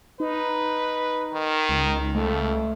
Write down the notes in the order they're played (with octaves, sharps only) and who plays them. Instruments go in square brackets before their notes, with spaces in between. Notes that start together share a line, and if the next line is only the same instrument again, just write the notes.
[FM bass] D#4 [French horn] B4
[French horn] D#3
[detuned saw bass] C#2
[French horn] F2 [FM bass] A3